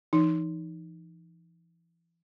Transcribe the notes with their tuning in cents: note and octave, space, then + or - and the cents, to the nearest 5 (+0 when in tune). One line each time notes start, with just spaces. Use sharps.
E3 +35 D#4 +0